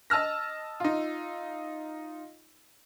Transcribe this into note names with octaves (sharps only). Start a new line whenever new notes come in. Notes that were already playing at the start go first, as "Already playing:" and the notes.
D#5 A5 E6 F6 A#6
D#4 F4